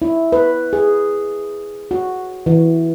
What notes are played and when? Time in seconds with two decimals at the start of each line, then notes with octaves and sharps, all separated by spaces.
0.02 E4
0.32 B4
0.73 G#4
1.91 F#4
2.46 E3